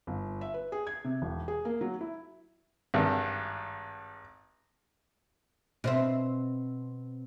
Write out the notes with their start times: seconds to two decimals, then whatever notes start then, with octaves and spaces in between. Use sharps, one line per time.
0.07 G1
0.41 E5
0.54 B4
0.72 G#4
0.87 G#6
1.04 C3
1.22 E1
1.48 G#4
1.65 A#3
1.81 F#3
2.01 E4
2.94 G#1 G2
5.84 B2 C4 E5